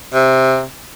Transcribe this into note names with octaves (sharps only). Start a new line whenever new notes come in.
C3